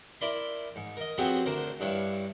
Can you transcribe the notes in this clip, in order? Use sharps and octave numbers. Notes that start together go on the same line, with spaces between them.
E4 A#4 D5 B5 C6
G#2
A#4 D#5
F3 F#3 B3 C4 G4 G#4
D2 D4 A#4 C5
G2 D4 E4 C#5 F5